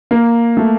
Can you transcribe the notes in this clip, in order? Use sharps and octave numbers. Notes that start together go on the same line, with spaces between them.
A#3
A3